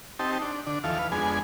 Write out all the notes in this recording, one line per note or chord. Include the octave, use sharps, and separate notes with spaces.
C4 D#4 G4 A5
D4
D3 D4
D#2 E3 F3 A4 F5
B4 F5
F2 G#3 B3 D4 G#4 G#5